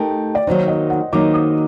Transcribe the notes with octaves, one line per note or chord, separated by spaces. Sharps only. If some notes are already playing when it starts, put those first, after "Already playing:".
Already playing: A3 D#4 G4 A#4 G5
D5
D#3 F#3 A#3 D#4 C5
D#5
F#5
D#3 F#3 A#3 D#4 D6
D#6